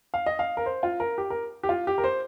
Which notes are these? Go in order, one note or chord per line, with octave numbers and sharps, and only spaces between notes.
F5
D#5
F5
A#4
C5
F4
A#4
G4
A#4
G4
F4
G4
A#4
C5